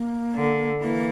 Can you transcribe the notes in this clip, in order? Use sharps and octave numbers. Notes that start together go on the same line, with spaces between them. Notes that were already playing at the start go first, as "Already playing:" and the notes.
Already playing: A#3
D3
E3 A#3